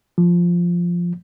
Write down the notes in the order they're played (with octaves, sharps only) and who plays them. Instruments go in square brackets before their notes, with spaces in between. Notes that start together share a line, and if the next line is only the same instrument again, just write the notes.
[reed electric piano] F3